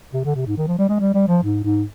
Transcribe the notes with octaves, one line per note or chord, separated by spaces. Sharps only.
C3
D3
C3
G#2
D#3
F3
G3
G#3
G3
G3
F3
G#2
G#2